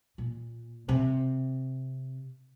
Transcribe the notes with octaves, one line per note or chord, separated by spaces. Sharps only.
A#2
C3